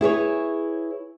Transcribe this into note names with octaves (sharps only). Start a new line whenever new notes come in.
E4 G#4 B4 C#5